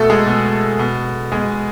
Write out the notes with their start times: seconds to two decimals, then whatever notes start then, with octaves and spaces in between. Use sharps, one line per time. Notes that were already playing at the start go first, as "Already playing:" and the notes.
Already playing: B2 A3 A4
0.10 G#3 G#4
0.27 B2
0.79 B2
1.32 B2 G#3 G#4